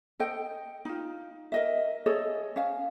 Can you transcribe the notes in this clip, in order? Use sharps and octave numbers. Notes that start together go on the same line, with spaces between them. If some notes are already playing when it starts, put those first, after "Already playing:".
A4 D#5 G5
D#4 F4
A#4 D#5 E5
G#4 A4 C#5 D#5
C#4 F5